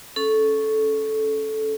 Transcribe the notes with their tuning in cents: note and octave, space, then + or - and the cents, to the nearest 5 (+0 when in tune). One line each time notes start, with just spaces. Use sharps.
C#4 +0 A4 -15